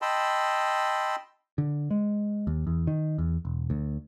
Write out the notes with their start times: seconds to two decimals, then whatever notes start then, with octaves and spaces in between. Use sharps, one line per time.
0.02 D#5 G5 A5 B5 C6 E6
1.58 D3
1.91 G#3
2.47 D#2
2.67 E2
2.87 D#3
3.18 E2
3.45 E1
3.70 D2